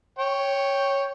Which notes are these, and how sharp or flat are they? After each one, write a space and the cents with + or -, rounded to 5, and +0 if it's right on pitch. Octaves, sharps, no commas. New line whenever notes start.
C#5 +0 G5 +0